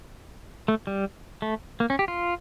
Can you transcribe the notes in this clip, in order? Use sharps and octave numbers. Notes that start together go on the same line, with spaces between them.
A3
G3
A3
A#3
C#4
G4
F4